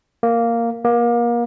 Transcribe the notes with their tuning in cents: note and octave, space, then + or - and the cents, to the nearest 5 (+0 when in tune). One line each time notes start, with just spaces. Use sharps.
A#3 -5
A#3 +30